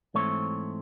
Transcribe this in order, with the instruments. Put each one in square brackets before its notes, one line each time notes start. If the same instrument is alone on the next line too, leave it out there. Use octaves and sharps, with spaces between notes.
[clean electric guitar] G#2 E3 A3 C4 C#5